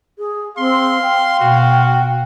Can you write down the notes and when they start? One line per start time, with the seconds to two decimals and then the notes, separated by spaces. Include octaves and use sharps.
0.18 G#4
0.58 C4 F5 C6
1.01 G5
1.40 B2 F#4